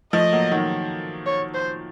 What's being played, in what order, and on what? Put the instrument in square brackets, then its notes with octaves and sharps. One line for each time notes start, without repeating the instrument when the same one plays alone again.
[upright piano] F3 A3 [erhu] D#5
[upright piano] F#3 A#3
D#3 F#3
[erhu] C#5
C5